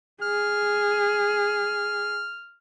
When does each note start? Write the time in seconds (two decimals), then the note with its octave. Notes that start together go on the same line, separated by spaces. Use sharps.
0.22 G#4 F6